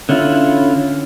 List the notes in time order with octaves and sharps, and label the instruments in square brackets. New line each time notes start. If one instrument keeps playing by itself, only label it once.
[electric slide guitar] D3 C#4 E4 F4